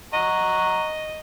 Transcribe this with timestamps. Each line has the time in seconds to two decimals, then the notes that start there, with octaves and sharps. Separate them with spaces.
0.13 D#5 F#5 A#5 C#6